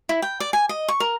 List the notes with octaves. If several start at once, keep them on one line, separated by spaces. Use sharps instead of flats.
E4
G5
D5
G#5
D#5
C#6
A#4